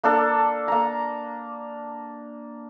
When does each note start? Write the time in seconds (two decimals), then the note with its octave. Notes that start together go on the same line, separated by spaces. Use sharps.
0.04 A#3 D4 A4
0.68 A#3 A#5